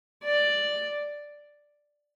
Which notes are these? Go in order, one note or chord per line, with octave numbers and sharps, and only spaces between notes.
D5